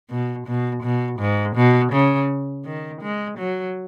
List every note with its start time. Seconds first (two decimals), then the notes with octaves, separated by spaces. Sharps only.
0.10 B2
0.47 B2
0.83 B2
1.20 G#2
1.56 B2
1.93 C#3
2.65 D#3
3.02 G#3
3.38 F#3